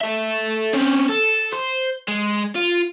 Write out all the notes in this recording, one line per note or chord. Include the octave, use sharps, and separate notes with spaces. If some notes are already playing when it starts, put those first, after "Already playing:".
A4 E5
C4 C#4
A4
C5
G#3
F4